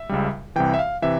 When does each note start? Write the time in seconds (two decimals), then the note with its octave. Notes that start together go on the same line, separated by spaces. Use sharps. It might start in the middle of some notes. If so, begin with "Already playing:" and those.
Already playing: E5
0.09 C#2 C#3 G3
0.56 C2 C3 E3 G5
0.74 E5
0.79 F5
1.02 C3 E3 E5